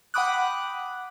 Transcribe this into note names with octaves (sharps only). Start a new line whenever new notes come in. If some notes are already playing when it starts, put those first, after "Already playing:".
F#5 G5 B5 D6 D#6 F#6